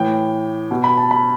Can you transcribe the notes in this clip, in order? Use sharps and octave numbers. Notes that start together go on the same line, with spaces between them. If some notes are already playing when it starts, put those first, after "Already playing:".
Already playing: A2 E3 G5
B2
B5
A5
B5